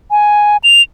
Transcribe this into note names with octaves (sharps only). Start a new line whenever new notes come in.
G#5
F7